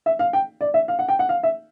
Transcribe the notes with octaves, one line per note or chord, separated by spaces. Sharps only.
E5
F5
G5
D5
E5
F5
F#5
G5
F#5
F5
E5